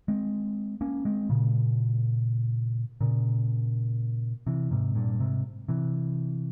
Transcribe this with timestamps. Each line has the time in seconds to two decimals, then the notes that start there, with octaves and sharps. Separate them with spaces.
0.08 G#3 C4
0.81 A#3 C#4
1.05 G#3 C4
1.29 A#2 C#3
3.01 A#2 C#3
4.47 C3 E3
4.71 G#2 C3
4.95 G2 A#2
5.19 G#2 C3
5.68 C3 E3